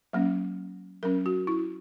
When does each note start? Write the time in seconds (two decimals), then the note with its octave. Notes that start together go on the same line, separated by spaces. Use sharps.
0.13 F#3 A#3 C#4
1.03 F#3 C#4 A#4
1.26 F#4
1.47 E4